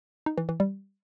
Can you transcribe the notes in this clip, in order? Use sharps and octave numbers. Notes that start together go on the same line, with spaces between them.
D#4
E3
E3
G3